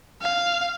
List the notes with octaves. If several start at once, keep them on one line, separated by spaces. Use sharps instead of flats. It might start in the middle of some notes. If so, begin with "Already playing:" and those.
F5